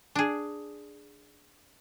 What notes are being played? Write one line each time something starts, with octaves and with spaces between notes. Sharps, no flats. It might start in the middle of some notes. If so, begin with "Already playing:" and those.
D4 G#4